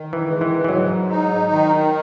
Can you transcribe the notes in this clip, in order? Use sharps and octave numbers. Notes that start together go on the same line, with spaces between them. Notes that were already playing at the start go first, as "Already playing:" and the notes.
Already playing: D#3
E3
G#3
E3
E3
G#2 F#3
D#4
D#3